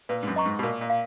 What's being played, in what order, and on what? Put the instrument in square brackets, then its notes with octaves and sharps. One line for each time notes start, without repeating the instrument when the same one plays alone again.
[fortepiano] A#2 [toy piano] B4
[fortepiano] G#2
F#2
[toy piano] D#5 A#5 C#6
[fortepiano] G#2
B2
[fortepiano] A#2 [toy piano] A#4
[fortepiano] A#2
[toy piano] F5